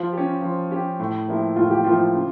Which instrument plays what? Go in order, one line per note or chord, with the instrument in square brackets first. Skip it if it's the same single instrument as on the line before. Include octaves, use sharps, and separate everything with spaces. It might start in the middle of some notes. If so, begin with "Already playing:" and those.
Already playing: [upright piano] F3 [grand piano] F4
[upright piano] C#4 G4
F3
C#4 G4
A2
F3 A#3 E4 G4
[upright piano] A2 [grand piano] F4
[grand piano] G4
[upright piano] F3 A#3 E4 G4 [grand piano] F4
[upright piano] C#3